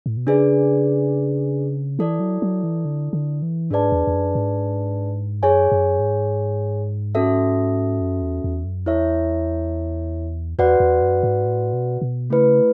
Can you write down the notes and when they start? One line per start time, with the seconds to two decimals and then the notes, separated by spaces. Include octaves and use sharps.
0.06 A2
0.17 B2
0.27 C#3 D4 G#4 B4 D5
1.99 E3 E4 A4 D5
2.20 F#3
2.42 F#3
2.63 E3
2.85 D3
3.13 D3
3.42 E3
3.71 G#2 D4 G#4 B4 D5 A5
3.92 E2
4.07 E2
4.14 F#2
4.35 G#2
5.43 F#2 G#4 C#5 G#5
5.72 F#2
5.99 G#2
7.15 C#4 F#4 A4 E5
8.01 F#2
8.22 E2
8.44 E2
8.65 F#2
8.86 E2 E4 A4 C#5 E5
10.59 E2 F#4 B4 D5 F#5
10.80 E2
11.02 F#2
11.23 G#2
11.45 A2
11.73 B2
12.02 B2
12.30 C#3 A3 E4 B4